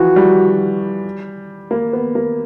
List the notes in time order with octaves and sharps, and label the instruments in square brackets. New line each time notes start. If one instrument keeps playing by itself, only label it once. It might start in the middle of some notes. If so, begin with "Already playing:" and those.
Already playing: [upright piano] E3 F3 [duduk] F#4
[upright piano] G3
A#3
B3
A#3